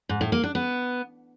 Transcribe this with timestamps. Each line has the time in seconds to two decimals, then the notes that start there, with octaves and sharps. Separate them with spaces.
0.09 G#2
0.21 A2
0.32 A#3
0.43 D4
0.55 B3